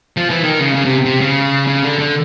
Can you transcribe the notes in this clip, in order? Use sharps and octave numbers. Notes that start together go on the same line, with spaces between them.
F3
E3
D#3
C#3
C#3
C3
C3
C#3
C#3
D3
D3